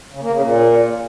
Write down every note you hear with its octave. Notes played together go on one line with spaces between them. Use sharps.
C#3
A#3
C#3
A#2